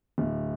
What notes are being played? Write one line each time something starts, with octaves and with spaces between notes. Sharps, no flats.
D1